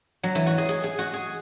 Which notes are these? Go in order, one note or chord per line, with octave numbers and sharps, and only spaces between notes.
F#3
E3
F#4
G#4
G#4
G#4
F#4
G#4